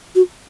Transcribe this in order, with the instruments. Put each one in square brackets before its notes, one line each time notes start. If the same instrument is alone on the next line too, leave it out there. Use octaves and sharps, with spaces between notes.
[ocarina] F#4